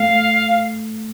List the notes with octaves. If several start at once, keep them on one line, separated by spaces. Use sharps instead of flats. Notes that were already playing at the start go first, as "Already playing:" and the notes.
Already playing: A3 F5